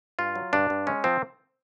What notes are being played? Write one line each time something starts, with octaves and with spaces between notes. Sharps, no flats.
G2 F4
F#3
G2 D4
G2
G#3 C#4
F3 C4